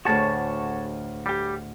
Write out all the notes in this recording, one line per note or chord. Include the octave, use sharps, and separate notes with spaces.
D2 A2 F#4 G#4 C#5 A5
G3 G4